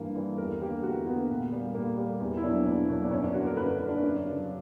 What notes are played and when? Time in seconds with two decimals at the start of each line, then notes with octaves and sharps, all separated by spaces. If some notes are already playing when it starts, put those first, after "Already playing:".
Already playing: G2 E3 G3 A#3
0.15 E3 G3 A#3
0.38 E2 A#4
0.61 D3 A#3 G4
0.83 E2 F#4
1.06 D3 A#3 B3
1.29 A#2
1.52 G3 A#3
1.75 A#2 A#3
1.98 G3 A#3
2.20 E2
2.37 E4
2.43 B2 F#3 A#3 D4
2.65 E2 D4
2.89 B2 F#3 A#3
3.04 D4
3.11 F#2 C#4
3.23 D4
3.34 D3 A#3 F#4
3.46 A#4
3.57 F#2 B4
3.72 A#4
3.80 D3 A#3
3.88 D4
4.03 F#2
4.26 C#3 F#3